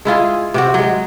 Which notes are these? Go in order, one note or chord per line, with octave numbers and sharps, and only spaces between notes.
G#3 E4 F4 G#4
C3 C4 F#4
F#3 G#3